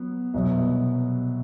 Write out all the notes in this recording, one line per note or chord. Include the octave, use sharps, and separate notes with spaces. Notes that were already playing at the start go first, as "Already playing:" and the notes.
Already playing: F#3 B3
C2 B2 F#3 B3